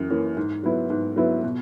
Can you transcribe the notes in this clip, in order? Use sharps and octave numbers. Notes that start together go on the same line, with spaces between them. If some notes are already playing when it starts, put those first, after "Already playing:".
Already playing: F#2 E3
E3 A#3 C#4
G#2
F#3 B3 E4 B4
G#2
F#3 B3 E4 B4
B2